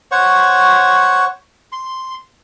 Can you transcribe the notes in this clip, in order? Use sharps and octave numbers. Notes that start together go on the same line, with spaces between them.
C5 C#5 F#5 C#6
C6